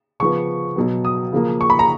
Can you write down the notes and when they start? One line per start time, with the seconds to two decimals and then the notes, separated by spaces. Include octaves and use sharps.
0.20 C#3 F3 B3 C#6
0.76 B2 F#3 B3
1.05 D#6
1.32 C#3 F3 A#3
1.61 C#6
1.70 B5
1.79 A#5